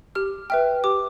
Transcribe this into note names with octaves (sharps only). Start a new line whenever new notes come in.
G4 F6
B4 E5 G5 F6
G4 D6